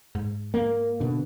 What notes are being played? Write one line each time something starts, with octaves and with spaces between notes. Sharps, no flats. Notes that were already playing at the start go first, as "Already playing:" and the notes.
G#2
A#3
B2 D3